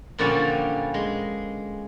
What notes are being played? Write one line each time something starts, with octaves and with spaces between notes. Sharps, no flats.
A#2 D3 F3 G3 C#4
G#3